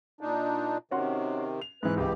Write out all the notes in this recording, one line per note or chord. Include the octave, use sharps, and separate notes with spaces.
A#2 D4 D#4
C3 D#3 C#4 F#4 C6
F7
G#2 E3 B4 F#6
C#2 E3 B3 G4